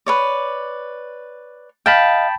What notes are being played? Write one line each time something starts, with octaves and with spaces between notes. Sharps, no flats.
B4 C#5 D5
D#5 F5 G5 A5 B5